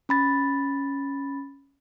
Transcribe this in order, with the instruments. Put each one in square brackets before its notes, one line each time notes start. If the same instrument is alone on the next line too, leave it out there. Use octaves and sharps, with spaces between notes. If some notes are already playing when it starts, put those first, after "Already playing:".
[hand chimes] C#4 B5 A6